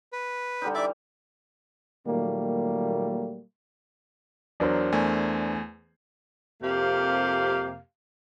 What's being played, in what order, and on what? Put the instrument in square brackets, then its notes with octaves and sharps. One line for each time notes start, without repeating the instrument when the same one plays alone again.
[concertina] B4
[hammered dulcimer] D3 G3 D#4
[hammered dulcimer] E3 [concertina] D5 E5 D6
[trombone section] A#2 D#3 F#3 G3 A3 A#3
[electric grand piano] E2 F#3 [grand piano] D4 A#4 C5
[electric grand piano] E2 A3 G#5
[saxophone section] F2 C3 A#3 G4 F5